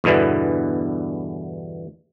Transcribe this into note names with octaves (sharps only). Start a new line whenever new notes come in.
E2 G2 B2 D3 E3